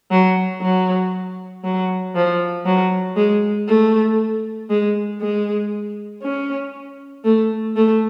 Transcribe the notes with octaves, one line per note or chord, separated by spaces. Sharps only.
F#3
F#3
F#3
F3
F#3
G#3
A3
G#3
G#3
C#4
A3
A3